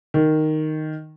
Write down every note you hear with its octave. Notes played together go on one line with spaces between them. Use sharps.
D#3